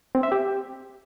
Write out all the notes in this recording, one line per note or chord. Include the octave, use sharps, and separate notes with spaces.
C4
E5
G4